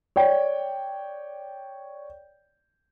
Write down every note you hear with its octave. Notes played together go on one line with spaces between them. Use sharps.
C#5 D5 G5